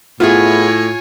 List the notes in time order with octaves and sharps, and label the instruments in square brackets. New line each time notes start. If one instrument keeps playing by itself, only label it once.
[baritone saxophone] A2 [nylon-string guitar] B3 E4 G#4 [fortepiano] F4 [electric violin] C#5 G#5